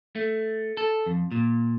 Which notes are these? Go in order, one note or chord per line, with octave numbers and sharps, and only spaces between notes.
A3
A4
F2
A#2